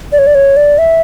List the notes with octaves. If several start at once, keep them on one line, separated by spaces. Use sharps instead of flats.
D5
C#5
D5
C#5
D5
E5